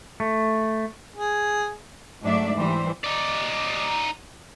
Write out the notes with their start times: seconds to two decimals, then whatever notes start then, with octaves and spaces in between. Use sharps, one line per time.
0.20 A3
1.16 G#4
2.21 G#2 F#3 A3 D4 D5 E5
2.57 E3 G3 C5
3.04 D#4 D5